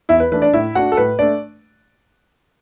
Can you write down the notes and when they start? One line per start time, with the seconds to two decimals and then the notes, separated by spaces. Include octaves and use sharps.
0.09 E2 E4 E5
0.20 B4
0.32 E3 A3 D4 B4
0.42 D4 D5
0.53 A2 E4 E5
0.75 A3 D4 F#4 F#5
0.92 A4
0.97 A2 B4
1.19 A3 D4 D5